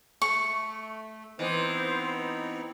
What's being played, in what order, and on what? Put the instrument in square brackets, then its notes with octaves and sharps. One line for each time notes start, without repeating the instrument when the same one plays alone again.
[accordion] A3 [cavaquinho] C#6
[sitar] E3 [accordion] B3 C4 D#4 [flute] C5